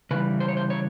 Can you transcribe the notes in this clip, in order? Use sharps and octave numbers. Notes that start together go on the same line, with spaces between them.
C#3 E3 G3 B4
C5
C#5
C5
C#5